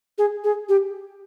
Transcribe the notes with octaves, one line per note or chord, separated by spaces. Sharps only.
G#4
G#4
G4